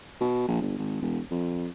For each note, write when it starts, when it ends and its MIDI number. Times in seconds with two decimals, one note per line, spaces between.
0.21 0.47 47
0.48 0.61 34
0.62 0.77 31
0.78 1.02 32
1.02 1.20 28
1.31 1.67 41